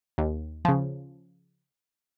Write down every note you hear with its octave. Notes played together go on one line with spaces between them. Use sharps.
D#2
C#3 F3